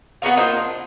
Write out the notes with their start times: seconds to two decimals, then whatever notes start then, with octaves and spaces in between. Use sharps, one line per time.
0.22 B3 F#4 A#4 F5
0.37 A#3 D#4 F4 C5
0.57 D4